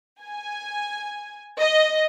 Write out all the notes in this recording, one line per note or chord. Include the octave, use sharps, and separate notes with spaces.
G#5
D#5